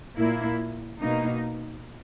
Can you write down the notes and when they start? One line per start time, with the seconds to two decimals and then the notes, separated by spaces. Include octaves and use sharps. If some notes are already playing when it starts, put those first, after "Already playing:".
0.17 A#2 A#3 E4
1.00 B2 A#3 D#4